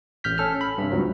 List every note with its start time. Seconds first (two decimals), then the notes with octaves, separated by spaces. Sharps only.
0.24 A1 F6 G6 B6
0.38 C#4 A4 F6
0.61 B5
0.78 G2 C3
0.92 C#2 G#2 F#3